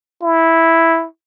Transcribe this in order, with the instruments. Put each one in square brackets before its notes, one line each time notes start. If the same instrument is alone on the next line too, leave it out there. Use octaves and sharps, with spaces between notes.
[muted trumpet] E4